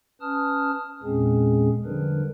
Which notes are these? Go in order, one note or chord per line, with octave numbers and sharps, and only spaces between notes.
C#4 B4 A5 D#6 F6
E2 A#2 G#3 C4 C#4 G#4
D3 F3 G3 D4 A#4 B4